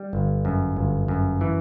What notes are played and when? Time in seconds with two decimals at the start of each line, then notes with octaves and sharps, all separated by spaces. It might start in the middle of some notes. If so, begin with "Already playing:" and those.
Already playing: G3
0.13 G1
0.45 F#2
0.77 G1
1.08 F#2
1.41 E3